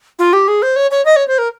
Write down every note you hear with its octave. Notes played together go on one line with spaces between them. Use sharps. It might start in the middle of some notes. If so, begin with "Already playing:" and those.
F4
G4
G#4
C5
C#5
C#5
D#5
C#5
C5
A#4